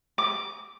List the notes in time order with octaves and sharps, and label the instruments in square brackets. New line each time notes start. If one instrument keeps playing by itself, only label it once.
[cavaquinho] D6